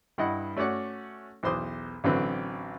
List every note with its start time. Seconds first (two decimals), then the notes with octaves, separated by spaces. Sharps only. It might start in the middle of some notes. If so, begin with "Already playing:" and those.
0.18 G2 E4 D#5 F#5
0.56 A3 C#4 F#4 D5 F#5
1.43 B1 E2 C5 C6 D6 D#6
2.04 A1 D3 F#3 C4 B4